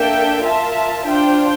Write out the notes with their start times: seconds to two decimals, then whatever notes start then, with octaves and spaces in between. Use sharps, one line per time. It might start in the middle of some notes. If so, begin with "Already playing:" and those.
Already playing: A#3 D4 A4 E5 G5
0.41 F4 A#4 E5 A5
1.05 D4 F4 C5 G5